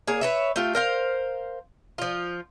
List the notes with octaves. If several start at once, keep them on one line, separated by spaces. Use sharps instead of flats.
A#3 G#4 C#5
B4 C#5 E5
A3 F4 G4
A#4 C5 F5
F3 F4